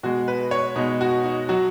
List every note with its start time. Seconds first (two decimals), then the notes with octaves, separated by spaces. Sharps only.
0.03 B2 G#3 F#4
0.28 B4
0.51 C#5
0.76 B2 G#3 D#4
1.01 F#4
1.24 D#4
1.49 F#3 F#4